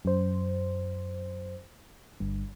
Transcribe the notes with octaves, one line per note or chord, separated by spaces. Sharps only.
F#2 C5
G1 G2